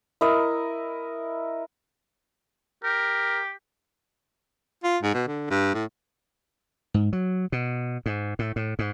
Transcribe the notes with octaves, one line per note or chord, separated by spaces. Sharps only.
E4 A#4 D#5
G4 A#4
F4
G#2
B2
D3
G2
A2
G#2
F#3
B2
G#2
A2
A2
G#2